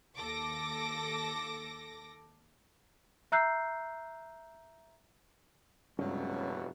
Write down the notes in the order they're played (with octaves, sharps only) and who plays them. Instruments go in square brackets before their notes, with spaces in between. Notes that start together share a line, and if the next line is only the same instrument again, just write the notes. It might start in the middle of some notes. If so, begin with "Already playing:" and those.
[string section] D#2 A4 D6 A#6
[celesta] E5 A#5 E6 F#6 G6 C7
[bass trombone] F1 [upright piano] C#2 G2 [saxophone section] B2 F#3 [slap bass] C#4